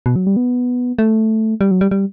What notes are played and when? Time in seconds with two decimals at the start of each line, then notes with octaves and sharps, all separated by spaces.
0.06 B2
0.16 F#3
0.27 G3
0.37 B3
0.99 A3
1.61 G3
1.71 F#3
1.81 G3
1.91 G3